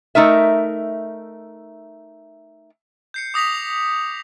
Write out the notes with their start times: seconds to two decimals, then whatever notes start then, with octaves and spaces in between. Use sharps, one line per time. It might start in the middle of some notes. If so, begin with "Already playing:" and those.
0.15 A3 D#4 A#4 E5
3.14 G6 C7 C#7
3.34 D6 D#6 A#6 B6 F7